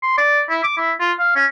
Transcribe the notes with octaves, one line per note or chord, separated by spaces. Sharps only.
C6
D5
E4
D6
E4
F4
F5
C#4